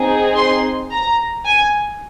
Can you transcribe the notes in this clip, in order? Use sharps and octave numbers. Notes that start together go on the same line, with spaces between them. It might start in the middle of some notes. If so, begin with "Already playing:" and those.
Already playing: C4 D#4 G#4
C6
A#5
G#5